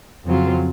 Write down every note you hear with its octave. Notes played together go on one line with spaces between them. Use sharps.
F2 C#3 F#3 C4 F4